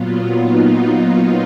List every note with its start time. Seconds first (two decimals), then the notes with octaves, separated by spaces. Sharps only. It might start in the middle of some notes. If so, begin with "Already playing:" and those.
Already playing: A#2 F#3 B3 F4
0.40 D#4
0.70 F4